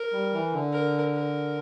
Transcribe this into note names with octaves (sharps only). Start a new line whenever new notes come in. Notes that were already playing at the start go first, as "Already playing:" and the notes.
Already playing: A#4
G3
E3
D3
A#4
A#4